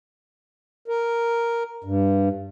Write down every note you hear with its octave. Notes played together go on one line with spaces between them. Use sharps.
A#4
G2